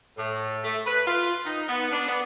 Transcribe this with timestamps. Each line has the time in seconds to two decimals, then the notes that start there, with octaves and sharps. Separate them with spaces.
0.17 A2
0.64 A3
0.86 B4
1.07 F4
1.45 D#4
1.68 B3
1.92 D4
2.08 B3